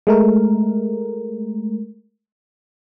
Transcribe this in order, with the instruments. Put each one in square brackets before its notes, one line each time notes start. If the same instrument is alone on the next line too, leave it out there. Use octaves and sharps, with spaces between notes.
[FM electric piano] G#3 A3 A#4